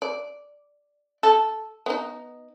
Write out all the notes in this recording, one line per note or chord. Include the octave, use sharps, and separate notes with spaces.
D5
A4
B3 D#4